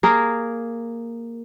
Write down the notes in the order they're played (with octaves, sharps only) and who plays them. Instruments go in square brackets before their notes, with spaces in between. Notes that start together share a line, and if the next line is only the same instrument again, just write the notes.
[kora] A#3 G#4 A#4